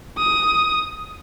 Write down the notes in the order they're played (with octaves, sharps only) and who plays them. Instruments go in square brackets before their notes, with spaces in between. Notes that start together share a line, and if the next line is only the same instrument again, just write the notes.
[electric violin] D#6